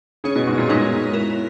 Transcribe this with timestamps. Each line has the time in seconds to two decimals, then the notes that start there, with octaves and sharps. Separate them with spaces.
0.24 C#3 C#4 G#4 C#5
0.36 B2
0.47 G#2
0.58 A#2
0.69 G#2 G#3 B3 D#4 A#4 C#5
1.13 B3 E4 A#4